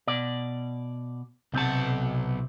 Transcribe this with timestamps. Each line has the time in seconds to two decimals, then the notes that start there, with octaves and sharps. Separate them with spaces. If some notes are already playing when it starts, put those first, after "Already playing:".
0.07 B2 D5
1.54 B1 C3 C4 F#4 A5